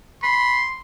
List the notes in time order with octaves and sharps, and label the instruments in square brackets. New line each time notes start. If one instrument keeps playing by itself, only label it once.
[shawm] B5 [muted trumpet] C6